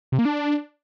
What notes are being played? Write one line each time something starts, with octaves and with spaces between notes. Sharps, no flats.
C3
A#3
D4